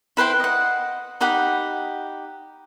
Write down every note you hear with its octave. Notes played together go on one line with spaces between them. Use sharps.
E4 B4 C5 G5
D#5 F#5
D#4 G4 F#5 B5